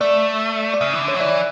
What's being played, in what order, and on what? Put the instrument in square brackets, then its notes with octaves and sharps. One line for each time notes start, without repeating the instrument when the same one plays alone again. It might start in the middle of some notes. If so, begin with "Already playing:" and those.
[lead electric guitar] A3 [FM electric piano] D5
[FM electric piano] D5
[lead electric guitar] C#3 [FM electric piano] E5
[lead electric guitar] E3
D3
[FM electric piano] C#5
[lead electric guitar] F#3
[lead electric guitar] E3 [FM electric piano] D5